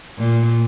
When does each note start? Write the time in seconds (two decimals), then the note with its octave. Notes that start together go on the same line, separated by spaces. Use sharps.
0.18 A#2